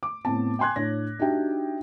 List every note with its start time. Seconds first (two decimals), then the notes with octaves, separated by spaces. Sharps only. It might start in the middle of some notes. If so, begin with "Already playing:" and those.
0.03 D6
0.25 A2 B3 C4 A5
0.59 G5 G#5 C6 F#6 G#6
0.76 A2 D4 C#5 A#6
1.19 D4 D#4 F#4 G4 E5 G5